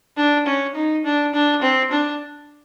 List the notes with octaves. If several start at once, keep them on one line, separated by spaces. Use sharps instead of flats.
D4
C#4
D#4
D4
D4
C4
D4